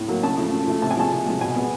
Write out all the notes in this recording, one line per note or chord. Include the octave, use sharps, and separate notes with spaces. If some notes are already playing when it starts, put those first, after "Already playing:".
Already playing: A2
F#3 A#3
C#3 A5
F3 A3
C#3
F3 A3
C3 A5
G#5
F3 G#3 A5
C3
F3 G#3
B2 G#5
G#3 B3